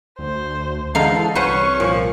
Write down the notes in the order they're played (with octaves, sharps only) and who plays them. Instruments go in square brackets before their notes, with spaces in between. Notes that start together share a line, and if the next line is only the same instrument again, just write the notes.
[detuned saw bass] D2 [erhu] C5
[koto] D3 D#4 F5 [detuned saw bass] E3 [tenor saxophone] G#3 [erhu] A4
[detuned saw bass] C2 [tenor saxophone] C#4 [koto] B4 C5 F#5 [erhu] C#6
[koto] A#2 [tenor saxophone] F3